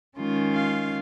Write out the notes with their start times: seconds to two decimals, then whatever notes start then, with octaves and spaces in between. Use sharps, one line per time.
0.18 D#3 G#3 C#4 F4
0.54 F5